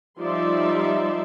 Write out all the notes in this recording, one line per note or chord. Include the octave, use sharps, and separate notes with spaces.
F3 G3 D#4 D5 E5 C6